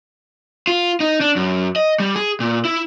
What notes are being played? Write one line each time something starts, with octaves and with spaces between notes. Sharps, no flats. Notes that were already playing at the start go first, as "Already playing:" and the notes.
F4
D#4
D4
F#2
D#5
G3
G#4
A#2
E4